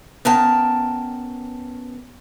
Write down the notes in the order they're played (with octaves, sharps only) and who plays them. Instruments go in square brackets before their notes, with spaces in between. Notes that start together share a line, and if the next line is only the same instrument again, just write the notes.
[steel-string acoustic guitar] B3 C#4 A#4 G5 A5